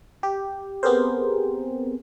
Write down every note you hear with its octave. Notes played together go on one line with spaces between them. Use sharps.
G4
B3 C4 G4 G#4 A#4 C5